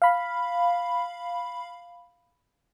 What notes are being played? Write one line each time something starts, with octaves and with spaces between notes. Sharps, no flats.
F5 B5